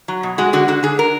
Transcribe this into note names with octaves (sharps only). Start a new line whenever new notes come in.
F#3
B2
G#3 F#4
D3 F#4
D3 F#4
D3 G#4
A#4